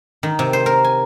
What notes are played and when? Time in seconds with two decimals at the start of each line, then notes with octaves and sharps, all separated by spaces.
0.23 D#3
0.39 C3
0.53 C5
0.66 A#4
0.84 G#5